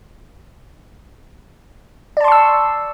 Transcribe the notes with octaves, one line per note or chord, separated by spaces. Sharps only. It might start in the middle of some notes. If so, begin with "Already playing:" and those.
D5 A5 C6 C#6 E6